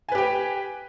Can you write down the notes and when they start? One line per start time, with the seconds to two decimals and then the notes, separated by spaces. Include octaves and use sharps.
0.09 G#5
0.12 B4
0.15 G4
0.18 G5